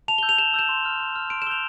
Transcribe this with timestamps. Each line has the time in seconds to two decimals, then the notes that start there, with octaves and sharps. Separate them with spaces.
0.08 A5 F7
0.18 G7
0.23 E6 G6
0.29 F7
0.38 A5 E7
0.54 E6 G6 E7
0.69 C6
0.85 F6
1.00 C6
1.16 F6
1.30 C6 D7
1.42 E7
1.47 E6 G7
1.50 G6 F7